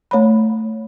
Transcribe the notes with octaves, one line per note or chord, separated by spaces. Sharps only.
A3 C#5 A#5 B5